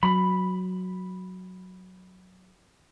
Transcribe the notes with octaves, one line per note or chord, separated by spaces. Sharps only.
F#3 B5